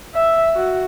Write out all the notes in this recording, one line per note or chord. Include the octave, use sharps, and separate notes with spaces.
E5
F#4